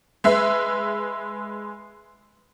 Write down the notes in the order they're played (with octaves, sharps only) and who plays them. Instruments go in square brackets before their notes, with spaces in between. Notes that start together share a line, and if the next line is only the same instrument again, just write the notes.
[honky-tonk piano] G#3 B4 E5